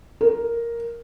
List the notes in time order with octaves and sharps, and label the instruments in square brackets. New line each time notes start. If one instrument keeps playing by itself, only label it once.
[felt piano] A#4